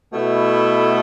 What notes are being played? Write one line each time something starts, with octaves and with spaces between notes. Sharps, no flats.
B2 A3 E4